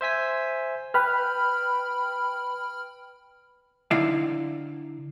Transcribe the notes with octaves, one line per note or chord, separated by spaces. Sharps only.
C5 E5 G#5 B6
B4 G5 B5 F6
D3 D#4 E4 F5